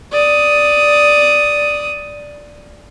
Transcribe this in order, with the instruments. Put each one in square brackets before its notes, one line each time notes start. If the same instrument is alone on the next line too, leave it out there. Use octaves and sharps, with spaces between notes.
[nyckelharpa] D5 D#6